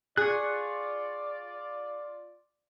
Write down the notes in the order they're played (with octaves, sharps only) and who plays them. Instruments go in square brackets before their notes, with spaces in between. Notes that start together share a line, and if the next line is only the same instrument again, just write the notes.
[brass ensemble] F4 D5 [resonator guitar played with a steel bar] G#4 [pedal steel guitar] C#6 F#6